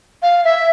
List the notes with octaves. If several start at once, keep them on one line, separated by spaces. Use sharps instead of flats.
F5
E5